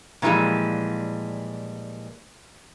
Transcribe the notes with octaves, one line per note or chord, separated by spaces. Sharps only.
A#2 E3 F3 G3 G#3